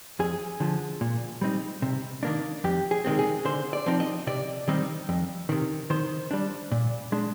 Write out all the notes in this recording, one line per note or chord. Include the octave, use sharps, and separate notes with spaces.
F2 G#4
D3 F3
A#2
G3 C4 D#4
C3
D#3 A#3 D4
F2 G4
G#4
C3 D#3 G#3 C4
G#4
D3 C5
D5
F3 C4 D#4
D#5
C3 D5
D#3 G3 C4 D#4
F2
C3 D#3
D#3 C5
G3 D4
A#2
G#3 D4